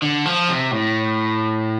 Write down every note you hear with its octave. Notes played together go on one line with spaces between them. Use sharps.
D3
F3
C3
A2